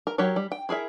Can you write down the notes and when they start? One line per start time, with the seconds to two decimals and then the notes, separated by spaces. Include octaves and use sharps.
0.07 A#4
0.18 F#3 G4 A#4 C#5
0.36 G3
0.52 G5
0.69 E4 G#4 A#4 E5